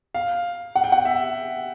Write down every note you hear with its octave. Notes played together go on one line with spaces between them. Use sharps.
F5
F#5
G5
F#5
E5